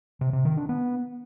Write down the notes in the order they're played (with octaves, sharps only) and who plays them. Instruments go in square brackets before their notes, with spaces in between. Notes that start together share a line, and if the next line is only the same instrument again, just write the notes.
[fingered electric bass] C3
C3
D#3
D4
B3